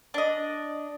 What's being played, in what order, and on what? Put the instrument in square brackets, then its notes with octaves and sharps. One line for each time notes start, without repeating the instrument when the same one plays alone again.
[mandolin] D4 D#5